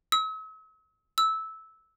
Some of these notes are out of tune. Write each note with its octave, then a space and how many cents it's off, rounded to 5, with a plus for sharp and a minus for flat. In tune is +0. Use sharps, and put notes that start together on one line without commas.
E6 -45
E6 -15